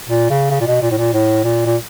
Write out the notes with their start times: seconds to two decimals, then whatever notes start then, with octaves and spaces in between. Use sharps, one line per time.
0.09 A#2
0.30 C#3
0.51 C#3
0.60 A#2
0.66 B2
0.82 A#2
0.91 A2
0.97 A#2
1.13 A2
1.44 A#2
1.66 A#2